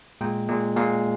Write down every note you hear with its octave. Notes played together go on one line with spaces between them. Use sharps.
A#2 G#3 G5
A#2 G#3
A#2 G#3 F5